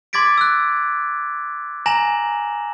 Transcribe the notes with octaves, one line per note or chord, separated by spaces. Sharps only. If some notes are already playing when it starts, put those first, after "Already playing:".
C6 D6 G#6 A6 B6 D7
E6 F#6
G#5 A#5 A#6 E7 F#7